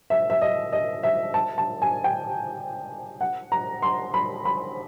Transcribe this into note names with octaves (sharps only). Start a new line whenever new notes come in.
E5
E5
D#5
D#5
E5
A5
A5
G#5
G5
F#5
A#5
C6
B5
B5